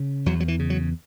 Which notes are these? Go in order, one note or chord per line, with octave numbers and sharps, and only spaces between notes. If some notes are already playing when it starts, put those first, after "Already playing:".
Already playing: C#3
E2 F#3
F#3
E3
C#3
F#3